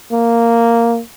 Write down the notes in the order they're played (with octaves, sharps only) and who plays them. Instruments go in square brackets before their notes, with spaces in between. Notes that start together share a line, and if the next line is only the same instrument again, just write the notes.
[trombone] A#3